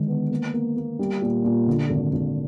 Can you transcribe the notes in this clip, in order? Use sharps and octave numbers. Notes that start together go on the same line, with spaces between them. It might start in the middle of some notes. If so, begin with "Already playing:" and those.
Already playing: D3 D#3 G#3
B3
A#3
A#3
A#3
G3
A#2
A#2
D3
G#1
G#1